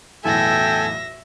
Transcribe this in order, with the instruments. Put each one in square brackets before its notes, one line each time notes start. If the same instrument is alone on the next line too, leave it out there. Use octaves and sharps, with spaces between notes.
[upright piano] B1 E2 A2 [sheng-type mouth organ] A4 G#5 [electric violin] E5 A#6 [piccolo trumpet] G5